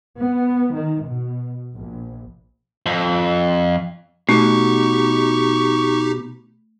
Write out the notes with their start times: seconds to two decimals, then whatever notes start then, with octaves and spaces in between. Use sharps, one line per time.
0.20 B3
0.74 D#3
1.04 B2
1.76 A#1
2.86 F2
4.29 B2 A3 D#4 G4 C#6